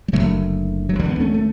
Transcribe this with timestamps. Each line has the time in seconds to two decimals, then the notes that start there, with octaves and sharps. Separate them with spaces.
0.08 G3
0.13 F#1 F#2 D3 F#3 A3
0.89 F#3
0.99 D2 D3 E3 G3
1.10 B3
1.20 A3 C#4
1.34 A3